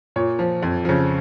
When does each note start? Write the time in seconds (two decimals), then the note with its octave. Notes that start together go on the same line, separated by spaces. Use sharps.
0.16 A#2 C#5
0.39 F3
0.63 F2
0.85 C#3 F3